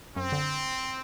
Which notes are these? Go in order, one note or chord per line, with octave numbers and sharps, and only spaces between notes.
F#2 C4
D3